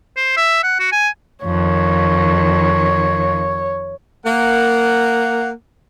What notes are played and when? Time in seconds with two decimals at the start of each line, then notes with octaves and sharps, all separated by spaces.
0.17 C5
0.37 E5
0.63 F#5
0.80 F#4
0.93 G#5
1.45 F2 D#3 C#5
4.26 A#3 F#5